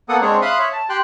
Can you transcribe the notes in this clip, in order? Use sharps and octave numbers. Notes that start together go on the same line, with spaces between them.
A#3 B3 A4 F#5 D#6
G#3 C4 D4 G#4 C#5
E5 F5 B5 C6 D#6 F#6
C#5 E5
A5
G4 G5 C6 F#6